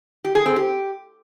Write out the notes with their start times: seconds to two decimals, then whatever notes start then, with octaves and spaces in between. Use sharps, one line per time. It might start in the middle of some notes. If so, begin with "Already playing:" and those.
0.24 G4
0.35 G#4
0.46 C4
0.56 G4